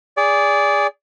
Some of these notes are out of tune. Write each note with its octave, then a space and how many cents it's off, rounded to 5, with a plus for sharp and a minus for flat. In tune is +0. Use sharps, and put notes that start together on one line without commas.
G#4 -15 D5 -20